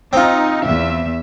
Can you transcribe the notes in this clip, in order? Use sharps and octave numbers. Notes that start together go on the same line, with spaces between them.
C4 D#4 F4
E2 E5